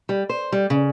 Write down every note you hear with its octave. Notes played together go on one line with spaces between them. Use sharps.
G3
C5
G3
C#3